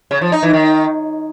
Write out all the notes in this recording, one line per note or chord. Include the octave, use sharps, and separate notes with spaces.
C#3
F3
D#4
E3
D#3